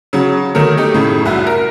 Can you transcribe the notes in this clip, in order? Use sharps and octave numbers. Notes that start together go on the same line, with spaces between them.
C#3 F#3
D#3 F#3 A3 A#4
A3 D#4 G4
F#2 A2 C#3
C2 F#4 E5
A#4